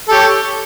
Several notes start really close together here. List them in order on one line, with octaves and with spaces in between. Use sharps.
A4 G4 C#5